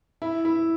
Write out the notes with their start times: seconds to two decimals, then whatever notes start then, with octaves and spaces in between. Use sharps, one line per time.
0.22 E4
0.45 E4